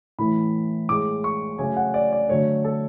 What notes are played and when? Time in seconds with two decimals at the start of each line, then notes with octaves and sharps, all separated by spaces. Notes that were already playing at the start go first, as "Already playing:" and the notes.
0.18 A2 E3 A3 B5
0.89 A2 G#3 D6
1.24 C#6
1.58 C#3 F#3 A3 G#5
1.77 F#5
1.94 D5
2.12 D5
2.29 D3 F#3 A3 C#5
2.64 A4